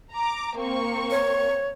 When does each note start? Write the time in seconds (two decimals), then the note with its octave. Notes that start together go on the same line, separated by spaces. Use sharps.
0.13 A#5 D6
0.58 A#3 C4 C#6
1.11 C#5